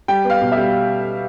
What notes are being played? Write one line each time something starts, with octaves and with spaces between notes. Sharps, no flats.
G3 G5
B3
F5
B2
E5
G3